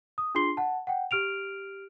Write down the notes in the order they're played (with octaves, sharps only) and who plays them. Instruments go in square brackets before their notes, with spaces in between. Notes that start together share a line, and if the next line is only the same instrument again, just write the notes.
[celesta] D#6
D4 F4 G#4 C6 C7 G7
F#5 A5
F#5 G5
G4 F6 D7 F7